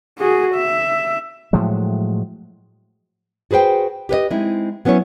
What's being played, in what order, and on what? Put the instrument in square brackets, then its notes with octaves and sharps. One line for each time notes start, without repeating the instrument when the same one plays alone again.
[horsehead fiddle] F#4 G#4
E5
[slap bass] A2 F3 F#3 G#3
[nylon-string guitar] F#4 G#4 B4 C5 G5
G4 B4 C#5 D#5
G#3 C4 D#4 E4
F#3 B3 C#4 E4 C#5